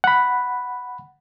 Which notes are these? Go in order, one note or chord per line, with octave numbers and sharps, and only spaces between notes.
F#5 B5